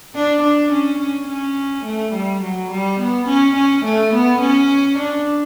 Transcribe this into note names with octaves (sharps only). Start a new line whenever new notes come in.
D4
D4
C#4
C#4
C#4
A3
G3
F#3
G3
B3
C#4
C#4
A3
B3
C#4
D4